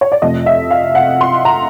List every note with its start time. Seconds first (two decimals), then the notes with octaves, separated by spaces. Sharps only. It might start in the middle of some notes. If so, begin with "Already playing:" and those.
0.01 C#5
0.12 D5
0.22 F2 C3 F3 A3 D#5
0.46 E5
0.70 F5
0.95 F#5
1.21 C6
1.45 A#5